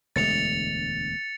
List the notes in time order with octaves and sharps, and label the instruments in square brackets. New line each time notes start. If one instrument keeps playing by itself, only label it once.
[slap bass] E1 D2 G#3 [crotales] A6 C#7 F7